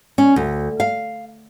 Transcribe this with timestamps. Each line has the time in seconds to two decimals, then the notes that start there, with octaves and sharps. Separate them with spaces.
0.18 C#4
0.36 D2
0.80 F5